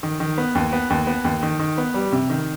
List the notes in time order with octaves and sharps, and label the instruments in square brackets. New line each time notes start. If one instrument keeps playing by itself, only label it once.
[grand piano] D#3
D#3
B3
D#2
B3
D#2
B3
D#2
D#3
D#3
B3
G3
C3
D#3